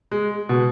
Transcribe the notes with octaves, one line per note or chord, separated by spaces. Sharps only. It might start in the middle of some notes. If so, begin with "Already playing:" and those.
G#3
B2